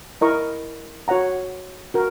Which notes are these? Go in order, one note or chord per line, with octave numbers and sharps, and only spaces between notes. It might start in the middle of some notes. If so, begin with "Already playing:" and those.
E4 A#4 D#5 A#5 C#6
F#4 C#5 F#5 A#5
F#4 A#4